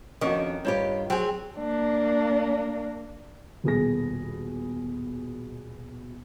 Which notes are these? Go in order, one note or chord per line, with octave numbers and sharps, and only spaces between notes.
F2 D#3 C#4 D4 F#4
G2 F4 G4 C5 C#5 B5
F#3 C4 G#4 C5 G5
A#3 D4
D#1 B2 G#4 A#6